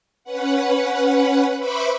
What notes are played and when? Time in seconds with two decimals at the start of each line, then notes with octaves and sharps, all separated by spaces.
0.24 C#4 B4 F#5
1.58 B4 C5 E5 B5 C#6 D6